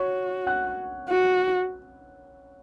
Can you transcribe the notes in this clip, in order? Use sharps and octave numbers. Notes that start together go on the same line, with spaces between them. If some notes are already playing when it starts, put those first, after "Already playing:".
Already playing: F#4 C#5 C#6
F#5 F#6
F#4